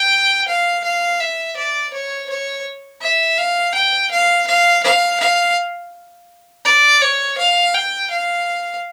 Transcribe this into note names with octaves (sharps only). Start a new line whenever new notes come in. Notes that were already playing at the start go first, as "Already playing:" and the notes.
Already playing: G5
F5
F5
E5
D5
C#5
C#5
E5
F5
G5
F5
F5
F5
F5
D5
C#5
F5
G5
F5